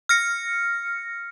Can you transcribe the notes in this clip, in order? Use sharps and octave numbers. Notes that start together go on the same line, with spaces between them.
F6 A#6 C#7